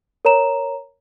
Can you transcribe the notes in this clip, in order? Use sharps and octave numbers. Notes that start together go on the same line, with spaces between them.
A#4 C#5 A#5 E7